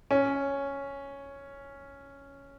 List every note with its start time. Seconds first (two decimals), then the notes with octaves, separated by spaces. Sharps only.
0.11 C#4